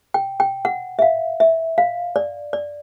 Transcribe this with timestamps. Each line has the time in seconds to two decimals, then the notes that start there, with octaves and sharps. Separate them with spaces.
0.14 G5
0.40 G5
0.65 F#5
0.99 E5
1.02 F5
1.40 E5
1.78 F5
2.16 D5
2.53 D5